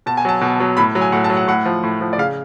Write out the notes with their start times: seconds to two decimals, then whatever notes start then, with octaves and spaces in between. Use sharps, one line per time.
0.06 B2 A5
0.17 G#5
0.25 F#3 A5
0.41 B2
0.60 F#3
0.77 A2 B5
0.95 F#3
1.01 G#5
1.12 A2 F#5
1.24 A5
1.30 F#3
1.37 F#5
1.48 A2 F#5
1.65 F3
1.83 A2
2.01 F3
2.13 D5
2.18 C#3 F5